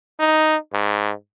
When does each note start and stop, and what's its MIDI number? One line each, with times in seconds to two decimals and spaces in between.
0.19 0.56 63
0.73 1.12 44